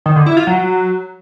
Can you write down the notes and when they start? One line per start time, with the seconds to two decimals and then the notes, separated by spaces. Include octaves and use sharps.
0.06 D#3
0.16 D3
0.26 E4
0.37 F4
0.47 F#3